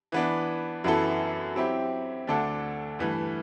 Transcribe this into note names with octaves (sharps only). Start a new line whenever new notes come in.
E3 B3 D4
F#2 E3 B3 E4 A4
F#3 C4 E4 G4
D2 D3 A3 D4 A4
G2 E3 A3